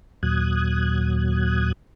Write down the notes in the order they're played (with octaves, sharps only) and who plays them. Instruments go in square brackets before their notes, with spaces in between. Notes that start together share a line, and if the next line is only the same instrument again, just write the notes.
[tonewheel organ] D#2 A#2 F#3 D#6 F#6 G#6